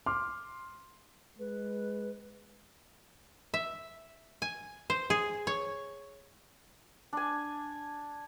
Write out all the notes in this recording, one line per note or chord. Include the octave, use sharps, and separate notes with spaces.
C6 D6 F6
G#3 B4
E5
G#5
C5
G#4
C#5
D4 G#5